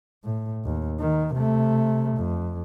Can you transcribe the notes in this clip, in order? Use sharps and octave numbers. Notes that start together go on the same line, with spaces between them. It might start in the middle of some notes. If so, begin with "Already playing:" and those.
A2
D#2
D#3
C3 A3
F2